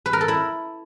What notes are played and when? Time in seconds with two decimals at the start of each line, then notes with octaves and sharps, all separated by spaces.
0.06 B4
0.13 A#4
0.21 A4
0.28 E4